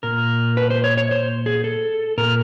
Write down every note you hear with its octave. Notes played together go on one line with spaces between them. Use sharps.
A#2 A#4
B4
C5
C#5
C#5
C5
G#4
A4
A#2 A#4